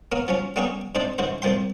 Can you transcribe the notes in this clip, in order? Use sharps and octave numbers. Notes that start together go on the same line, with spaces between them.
A#3 B3 A#4 C#5
F3 F#3 C#4
G3 A#3 B3 C#4 G4 G#4
G#2 C3 D4 C5 D5
G#2 C#3 E3 F#4 C5
C2 A#2 F3 G5 C6